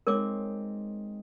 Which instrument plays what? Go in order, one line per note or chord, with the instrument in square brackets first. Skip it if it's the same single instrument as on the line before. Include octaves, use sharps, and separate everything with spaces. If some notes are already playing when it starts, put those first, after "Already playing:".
[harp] G#3 C4 D#4 [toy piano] A#4 C#5 D6